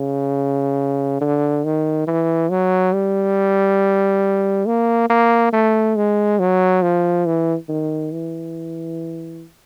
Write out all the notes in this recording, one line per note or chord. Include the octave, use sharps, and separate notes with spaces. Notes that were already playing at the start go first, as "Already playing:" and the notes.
Already playing: C#3
D3
D#3
E3
F#3
G3
A#3
A#3
A3
G#3
F#3
F3
E3
D#3
E3